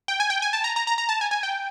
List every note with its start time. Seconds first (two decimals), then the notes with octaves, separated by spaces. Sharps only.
0.08 G5
0.20 G#5
0.30 G5
0.42 G#5
0.53 A5
0.64 A#5
0.76 A#5
0.87 A#5
0.98 A#5
1.09 A5
1.21 G#5
1.31 G#5
1.43 G5